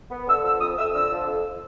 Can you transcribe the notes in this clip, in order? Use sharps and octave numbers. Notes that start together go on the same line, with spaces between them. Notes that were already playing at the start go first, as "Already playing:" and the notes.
B3
D3 E6
F3 E6
F2 D#6
F2 E6
D3 E6
F3
F2